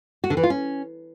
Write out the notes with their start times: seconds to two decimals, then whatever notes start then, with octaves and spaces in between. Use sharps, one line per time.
0.24 F#4
0.30 D3
0.37 E3
0.43 F4
0.50 C#4